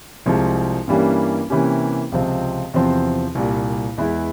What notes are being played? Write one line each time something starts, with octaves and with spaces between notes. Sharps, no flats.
C2 C3 F3 G#3
G2 E3 G3 A#3 C#4
C3 E3 A#3 C#4 G4
C#2 C3 F3 C4
E2 C3 F3 C4
C2 A#2 G3
E2 E3 G#3 E4